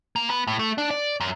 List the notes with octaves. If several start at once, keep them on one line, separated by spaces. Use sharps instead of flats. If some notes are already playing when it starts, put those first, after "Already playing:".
A#3
B3
A2
A3
D4
D5
F#2